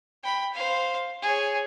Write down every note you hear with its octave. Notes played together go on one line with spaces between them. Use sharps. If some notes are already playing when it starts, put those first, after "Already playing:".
G5 B5
C5 F5
G#4 C#5